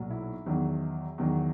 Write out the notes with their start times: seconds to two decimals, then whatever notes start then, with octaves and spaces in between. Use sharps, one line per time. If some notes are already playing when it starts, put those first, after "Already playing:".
Already playing: B1 A#2 F#3
0.10 E4
0.46 E2 D#3 F#3
1.18 E2 D#3 F#3